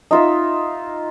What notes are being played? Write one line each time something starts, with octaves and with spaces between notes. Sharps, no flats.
D#4 F4 E5